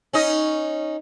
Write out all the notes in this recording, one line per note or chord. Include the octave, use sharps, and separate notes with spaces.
C#4 D#4 D#5